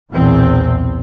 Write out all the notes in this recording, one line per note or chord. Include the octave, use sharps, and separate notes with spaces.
B1 E2 A#2 E3 C4